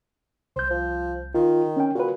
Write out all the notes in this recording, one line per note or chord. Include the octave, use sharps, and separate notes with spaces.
C2 C5 G6
F3
D#3 F4
C#4 G5
A#2 F#4 B4